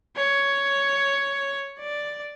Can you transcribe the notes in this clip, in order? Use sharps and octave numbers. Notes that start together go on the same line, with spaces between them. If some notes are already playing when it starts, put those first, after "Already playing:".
C#5
D5